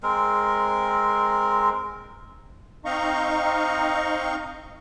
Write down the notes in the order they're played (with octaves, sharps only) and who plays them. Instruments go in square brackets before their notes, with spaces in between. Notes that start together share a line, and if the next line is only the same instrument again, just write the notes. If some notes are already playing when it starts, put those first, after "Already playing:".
[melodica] G#3 C4 A#4
[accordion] C4 D#4 D#5 F5 A#5 C#6